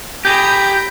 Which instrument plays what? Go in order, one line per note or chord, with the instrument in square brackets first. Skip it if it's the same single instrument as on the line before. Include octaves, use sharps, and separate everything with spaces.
[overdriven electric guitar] G4 G#4 [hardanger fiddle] A#5 B5 [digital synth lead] G6